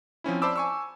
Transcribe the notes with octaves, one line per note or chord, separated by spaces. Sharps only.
F3 C4 C#4 E4
C5 D5 A5 B5 D6 E6
G#5 C#6 E6